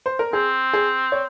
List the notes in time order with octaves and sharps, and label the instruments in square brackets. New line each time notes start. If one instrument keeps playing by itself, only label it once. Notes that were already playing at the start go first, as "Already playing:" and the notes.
[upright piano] C5
A#4
[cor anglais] C4 [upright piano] G#4
[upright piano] G#4
C#5